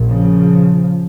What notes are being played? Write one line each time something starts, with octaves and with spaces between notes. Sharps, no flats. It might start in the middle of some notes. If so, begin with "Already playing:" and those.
Already playing: A#1 A#2
C#3 F3